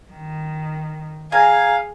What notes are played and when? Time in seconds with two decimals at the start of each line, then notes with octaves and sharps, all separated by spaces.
0.11 D#3
1.32 G#4 F5 G#5 A#5